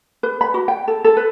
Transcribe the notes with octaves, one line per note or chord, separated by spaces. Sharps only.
B4
B5
F#4
G5
A4
A4
B4